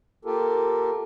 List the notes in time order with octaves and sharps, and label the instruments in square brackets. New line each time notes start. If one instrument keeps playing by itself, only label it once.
[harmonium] A#3 F4 G4 A4 A#4